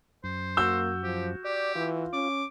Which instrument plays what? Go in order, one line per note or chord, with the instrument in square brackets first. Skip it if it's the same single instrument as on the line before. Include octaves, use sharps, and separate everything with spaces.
[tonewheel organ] F#2 [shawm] C5
[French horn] A#3 [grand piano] F#4 E6 G6
[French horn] F3 [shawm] G4
[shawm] G4 [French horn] D5
[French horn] E3 [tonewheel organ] F4
[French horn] C#4 [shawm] D6